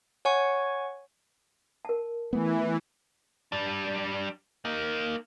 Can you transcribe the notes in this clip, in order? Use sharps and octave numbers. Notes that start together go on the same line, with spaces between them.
C#5 F#5 G#5 C#6
A#4 A5
E3 A3 B3
G3 D4
A#3 D#4